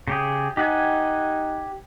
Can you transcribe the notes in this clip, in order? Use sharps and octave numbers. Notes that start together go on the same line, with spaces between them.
C#3 G4 G#4
D#4 G4 F#5 G#5